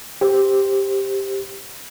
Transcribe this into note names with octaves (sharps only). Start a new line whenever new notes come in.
G4 C5